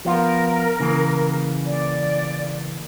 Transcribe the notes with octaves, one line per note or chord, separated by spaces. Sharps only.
F3 B3 F4 A#4
C#3 E3 A#3
D5